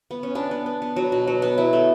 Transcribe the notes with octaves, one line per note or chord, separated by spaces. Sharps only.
B3
C#4
B3 D4
B3
B3
B3
F#3
B2
F#3
B3
F#3 E4
A3